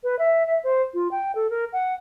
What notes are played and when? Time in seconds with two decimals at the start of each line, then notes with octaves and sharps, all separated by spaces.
0.04 B4
0.19 E5
0.47 E5
0.64 C5
0.94 F4
1.11 G5
1.35 A4
1.50 A#4
1.73 F#5